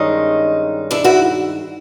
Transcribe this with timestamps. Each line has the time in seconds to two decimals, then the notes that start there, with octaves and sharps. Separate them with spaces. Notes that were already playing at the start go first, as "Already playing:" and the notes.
Already playing: G2 D#3 G#3 C#4 D#4
0.91 D4 E4
1.04 E4 F#4